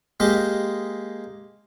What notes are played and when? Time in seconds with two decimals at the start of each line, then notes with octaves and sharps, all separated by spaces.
0.20 G#3 A#3 G4